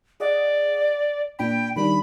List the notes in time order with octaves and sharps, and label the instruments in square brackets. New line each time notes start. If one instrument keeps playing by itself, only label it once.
[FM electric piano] G#4 D#5 F#5 [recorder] D5
[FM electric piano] A#2 D4 B5 [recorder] G5
[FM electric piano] D#3 G3 D4 [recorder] B5